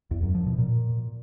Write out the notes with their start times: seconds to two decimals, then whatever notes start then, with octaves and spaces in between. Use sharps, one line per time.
0.11 E2
0.23 F#2
0.35 F3
0.46 B2
0.58 A#2